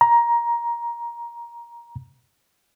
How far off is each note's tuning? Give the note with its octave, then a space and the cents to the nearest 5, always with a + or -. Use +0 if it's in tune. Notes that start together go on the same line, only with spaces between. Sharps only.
A#5 +15